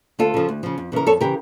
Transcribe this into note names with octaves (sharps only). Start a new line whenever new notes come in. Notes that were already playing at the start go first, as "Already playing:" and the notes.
D2 F4 A4
C#3 F3
D2
C#3 F3
F2
C#3 E3 A#4
F2 A4 C#5
C#3 E3 G4 A#4